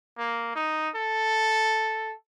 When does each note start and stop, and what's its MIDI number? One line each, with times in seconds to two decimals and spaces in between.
0.18 0.52 58
0.55 0.89 63
0.96 2.14 69